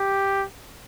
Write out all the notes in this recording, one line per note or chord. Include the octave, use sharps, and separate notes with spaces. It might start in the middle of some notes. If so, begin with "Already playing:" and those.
Already playing: G4